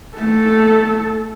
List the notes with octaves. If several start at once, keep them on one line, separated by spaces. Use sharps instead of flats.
A3 A4